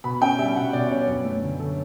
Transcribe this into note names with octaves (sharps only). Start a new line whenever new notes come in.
B2 B5
C#4 G5
G3 E5
B2 F#5
B2 D5
C#4 C#5
F#2
A3
D3
A4